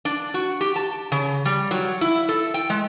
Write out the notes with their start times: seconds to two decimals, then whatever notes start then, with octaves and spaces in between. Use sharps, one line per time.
0.05 D4
0.34 F#4
0.61 G4
0.76 A5
1.12 C#3
1.45 G3
1.71 F#3
2.01 E4
2.29 A4
2.54 G5
2.70 G#3